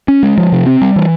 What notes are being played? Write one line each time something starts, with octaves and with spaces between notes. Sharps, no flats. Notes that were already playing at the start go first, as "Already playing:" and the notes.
C#4
G#3
F3
C3
C4
G3
E3